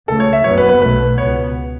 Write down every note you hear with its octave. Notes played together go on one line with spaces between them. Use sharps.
C#2 C#3 A3 A4
C#5
E5
F#1 F#2 F#3 B3 C#5
B4
B4
B1 B2 A3 B4
C#2 B2 B3 C#5